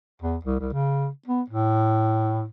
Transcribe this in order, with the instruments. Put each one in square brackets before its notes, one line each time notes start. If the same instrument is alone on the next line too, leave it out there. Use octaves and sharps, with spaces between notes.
[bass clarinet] E2
C2
C2
C#3
B3
A2